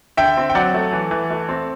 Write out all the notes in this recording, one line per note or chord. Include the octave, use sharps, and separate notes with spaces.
D3 E5 G5
C4
G5
F#3 D5 F#5
A3
E3
E3
A3
C4